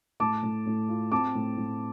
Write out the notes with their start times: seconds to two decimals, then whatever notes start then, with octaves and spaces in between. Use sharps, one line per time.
0.20 A2 A5 D6
0.43 A2
0.66 A2
0.89 F4
1.12 C4 A5 D6
1.35 A2
1.57 A2